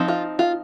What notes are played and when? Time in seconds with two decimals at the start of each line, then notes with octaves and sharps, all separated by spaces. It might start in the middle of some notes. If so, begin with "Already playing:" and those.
Already playing: F3 C4 D#4
0.08 F4
0.39 F4